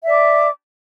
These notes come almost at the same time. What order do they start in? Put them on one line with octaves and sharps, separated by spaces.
E5 D5 D6